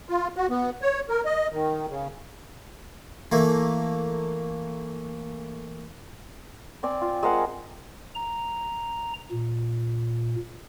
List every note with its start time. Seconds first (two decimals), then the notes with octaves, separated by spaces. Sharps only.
0.09 F4
0.36 F#4
0.50 B3
0.82 C#5
1.09 A#4
1.25 D#5
1.52 D#3
1.90 C#3
3.32 E3 A3 A#3
6.83 C4 D5 G#5
7.01 F4
7.23 G#3 A#4 C5 F#5
8.15 A#5
9.32 A#2